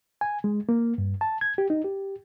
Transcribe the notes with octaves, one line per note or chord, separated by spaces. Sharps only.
G#5
G#3
A#3
G2
A5
G#6
G4
D#4
G4